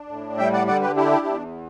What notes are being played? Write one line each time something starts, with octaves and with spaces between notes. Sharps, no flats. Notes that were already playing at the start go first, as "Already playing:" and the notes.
Already playing: D4
A2
G3 E5 G5
D5 F#5
D3 D5 F#5
G4 B4
D4 E4 G4
E2